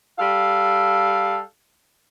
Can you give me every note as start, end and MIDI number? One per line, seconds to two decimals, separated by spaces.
0.18 1.39 55
0.18 1.39 69
0.18 1.39 77